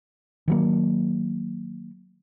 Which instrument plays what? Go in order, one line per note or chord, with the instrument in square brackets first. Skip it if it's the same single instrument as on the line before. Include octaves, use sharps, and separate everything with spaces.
[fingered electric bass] D#3 F#3 A#3